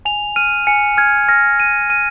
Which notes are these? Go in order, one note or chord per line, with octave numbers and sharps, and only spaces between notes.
G#5 F7
F6 D#7
G#5 C#7
F6 G#6
F6 A#6
F6 D#7
F6 D#7